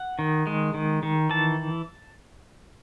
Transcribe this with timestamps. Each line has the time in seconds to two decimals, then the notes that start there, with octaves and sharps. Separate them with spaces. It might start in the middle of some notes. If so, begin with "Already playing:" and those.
Already playing: F#5
0.19 D#3
0.47 G#3
0.74 D#3
1.03 D#3
1.29 E3 A5